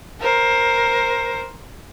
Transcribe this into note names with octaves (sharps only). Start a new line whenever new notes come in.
A#4 C5